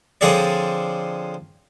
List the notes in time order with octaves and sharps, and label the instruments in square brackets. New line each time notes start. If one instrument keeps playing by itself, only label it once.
[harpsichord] D3 F3 C4 G#4 C#5 D5